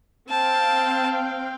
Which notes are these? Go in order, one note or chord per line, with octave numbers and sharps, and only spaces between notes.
C4 F5 G5 A5